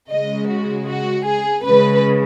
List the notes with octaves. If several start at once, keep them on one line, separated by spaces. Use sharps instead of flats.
C#3 G#3 D#5
F#4
F#4
G#4
C#3 G#3 B4